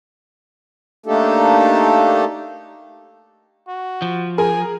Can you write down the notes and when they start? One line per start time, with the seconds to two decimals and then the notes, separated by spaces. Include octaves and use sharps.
1.06 A3 A#3 D4 D#4 G4 A4
3.68 F#4
4.02 F3
4.38 G#4 A#4 G#5